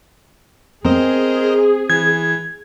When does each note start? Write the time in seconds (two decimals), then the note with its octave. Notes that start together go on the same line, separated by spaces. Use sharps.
0.85 C4 G#4 A#4 C5 D#5
1.90 E3 G#6